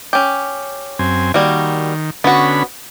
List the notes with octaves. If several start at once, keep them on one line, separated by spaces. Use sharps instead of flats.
C#4 G4
F#2 C4 G#5
D#3 G3 A#3 F#4
D3 B3 C#4 F#4 B5